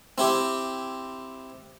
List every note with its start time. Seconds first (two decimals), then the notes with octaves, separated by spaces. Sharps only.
0.18 C4 E4 G4